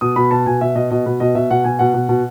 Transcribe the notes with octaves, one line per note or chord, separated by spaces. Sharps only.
B2 D#6
B2 B5
B2 A5
B2 G#5
B2 E5
B2 D#5
B2 D#5
B2 B4
B2 D#5
B2 E5
B2 F#5
B2 G#5
B2 F#5
B2
B2